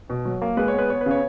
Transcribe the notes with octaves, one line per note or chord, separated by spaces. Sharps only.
B2
F#3
A#3
G#3 B4
C#5
B3 B4
B3 C#5
B4
C#3 C#5